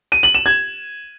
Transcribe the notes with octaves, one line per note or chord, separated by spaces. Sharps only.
D#7
F#7
E7
G#6